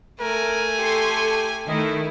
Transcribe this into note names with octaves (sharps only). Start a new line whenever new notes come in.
A3 A#4 G#5
G4 A4 C6 C#6
D#3 A3 E4 D#5